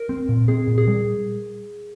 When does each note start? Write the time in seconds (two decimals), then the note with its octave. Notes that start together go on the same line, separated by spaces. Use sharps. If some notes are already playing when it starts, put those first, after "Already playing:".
Already playing: A#4
0.09 C4
0.29 A#2
0.48 C4 G#4
0.68 A#2
0.78 G#4
0.87 G3